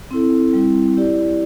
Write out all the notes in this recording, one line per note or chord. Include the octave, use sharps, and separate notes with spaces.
C4 E4 A4
G3 C4 E4
E4 G4 D5